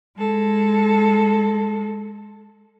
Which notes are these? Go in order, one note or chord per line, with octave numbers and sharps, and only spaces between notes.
G#3 A4